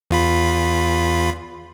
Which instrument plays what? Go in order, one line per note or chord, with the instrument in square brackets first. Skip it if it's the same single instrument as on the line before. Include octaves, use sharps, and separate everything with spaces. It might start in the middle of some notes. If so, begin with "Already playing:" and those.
[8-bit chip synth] E2 F4 B5